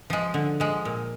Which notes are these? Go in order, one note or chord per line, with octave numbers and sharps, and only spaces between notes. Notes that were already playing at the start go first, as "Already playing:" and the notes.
F3 G#3
D3
F3 G#3
A#2